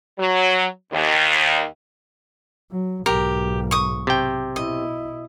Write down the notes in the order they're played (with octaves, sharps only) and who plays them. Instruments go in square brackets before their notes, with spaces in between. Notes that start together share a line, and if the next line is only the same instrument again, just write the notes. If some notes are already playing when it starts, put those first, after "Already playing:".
[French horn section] F#3
D#2
[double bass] F#3
[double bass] B1 G#2 [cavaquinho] G4 [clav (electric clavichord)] A#4
[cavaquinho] C#6 D#6
[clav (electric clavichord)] C3 G5
[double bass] B2 E4 [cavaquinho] D#5